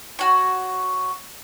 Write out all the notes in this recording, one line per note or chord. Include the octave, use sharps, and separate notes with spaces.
F#4 C#5